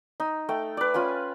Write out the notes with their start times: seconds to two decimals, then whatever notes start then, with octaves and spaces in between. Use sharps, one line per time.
0.20 D#4
0.49 A3 G5
0.77 B4 D5
0.94 C#4 F4 G#5 B5